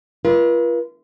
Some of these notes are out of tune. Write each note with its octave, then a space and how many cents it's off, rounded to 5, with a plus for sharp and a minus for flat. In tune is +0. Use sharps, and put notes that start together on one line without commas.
F4 -30 B4 -45